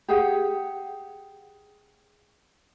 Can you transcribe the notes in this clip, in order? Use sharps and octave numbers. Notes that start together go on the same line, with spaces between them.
G4 G#4 F#5